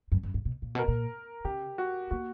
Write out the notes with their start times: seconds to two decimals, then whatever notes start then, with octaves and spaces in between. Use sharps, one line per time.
0.12 F#2
0.23 F#2
0.34 G2
0.45 B2
0.62 A#2
0.75 B2 A#4
0.88 A#2
1.45 C#3 G4
1.78 F#4
2.11 A#3 F#4